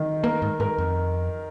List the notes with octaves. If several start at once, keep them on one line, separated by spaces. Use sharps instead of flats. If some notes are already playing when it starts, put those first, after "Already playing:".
Already playing: D#3
A#3 A#4
G#2
G#2 A#4
F2